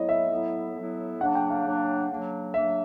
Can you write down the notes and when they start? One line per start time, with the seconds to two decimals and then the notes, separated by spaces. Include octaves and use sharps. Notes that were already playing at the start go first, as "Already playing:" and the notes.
Already playing: A2 F#3 B3 E4 C#5 D#5
0.09 E5
0.30 A2 F#3 B3 E4
0.76 A2 F#3 B3 E4
1.21 C#3 F#3 A#3 D4 F#5
1.35 G5
1.50 F5
1.65 C#3 F#3 A#3 D4
2.10 C#3 F#3 A#3 D4
2.54 C#3 F#3 A#3 D4 E5